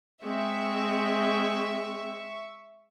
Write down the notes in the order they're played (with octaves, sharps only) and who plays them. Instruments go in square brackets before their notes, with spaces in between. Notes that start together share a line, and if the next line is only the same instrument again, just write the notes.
[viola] G#3 C4 [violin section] E5 C#6